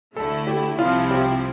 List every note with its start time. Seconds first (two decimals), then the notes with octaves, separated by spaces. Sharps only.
0.16 D2 D3 A3 E4 A4
0.47 G4
0.79 C2 C3 F3 C4 E4 F4
1.11 G4